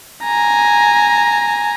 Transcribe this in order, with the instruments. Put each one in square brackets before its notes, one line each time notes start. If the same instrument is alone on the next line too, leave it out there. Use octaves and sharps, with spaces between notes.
[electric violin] G#5 A#5